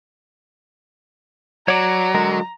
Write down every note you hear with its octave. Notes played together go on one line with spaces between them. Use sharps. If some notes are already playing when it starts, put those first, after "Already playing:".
F#3 C#5 D5 A#5
D3 G#3 A#4